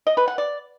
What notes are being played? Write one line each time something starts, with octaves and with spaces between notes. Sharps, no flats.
D#5
B4
F#5
D5